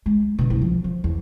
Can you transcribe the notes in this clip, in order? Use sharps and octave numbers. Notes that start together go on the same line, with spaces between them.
G#3
B2 D3
F#1 C2
F3
F3
E2